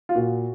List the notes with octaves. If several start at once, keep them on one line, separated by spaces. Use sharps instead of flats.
F4
A#2 F#4